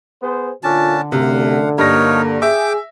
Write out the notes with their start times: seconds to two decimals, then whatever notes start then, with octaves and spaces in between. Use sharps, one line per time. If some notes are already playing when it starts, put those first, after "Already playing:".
0.23 B3 G#4 C5
0.64 A#2 D3 C#4 D4 F4 A5
1.12 F#2 C3 A3 F5 F#5
1.78 G2 A#3 D#4 A#4 C#5 A#6
2.42 G#4 E5 G5 D6